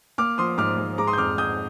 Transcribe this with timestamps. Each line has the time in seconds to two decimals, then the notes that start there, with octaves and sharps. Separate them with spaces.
0.18 A#3 D6 F6
0.38 F3 C6 D#6
0.58 G#2 D6 F6
0.78 G#2
0.98 G#3 A#5 D6
1.07 C6 D#6
1.13 G6
1.18 F2 D6 F6
1.37 F2 D#6 G6